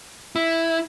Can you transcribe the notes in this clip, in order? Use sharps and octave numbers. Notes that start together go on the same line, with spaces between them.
E4